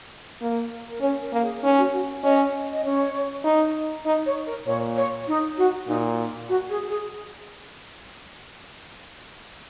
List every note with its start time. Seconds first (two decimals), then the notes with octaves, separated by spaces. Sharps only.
0.41 A#3
0.90 A#4
1.01 C#4 C#5
1.22 A#4
1.32 A#3
1.42 G#4
1.62 C#4 D#4
1.77 F#4
1.93 F#4
2.23 C#4 D#5
2.72 D#5
2.84 C#4 C#5
3.44 D#4
4.06 D#4
4.26 C#5
4.46 A#4
4.66 A#2 C#5
4.96 C#5
5.27 D#4
5.57 F#4
5.87 A#2 D#4
6.48 F#4
6.69 G#4
6.88 G#4